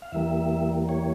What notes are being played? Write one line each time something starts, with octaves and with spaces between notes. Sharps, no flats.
F5
E2 E3 G3 A#3 E5
C#5